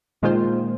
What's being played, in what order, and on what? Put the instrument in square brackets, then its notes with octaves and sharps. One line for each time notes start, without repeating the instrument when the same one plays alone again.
[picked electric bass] A#2 [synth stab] D#3 G#3 F4 C5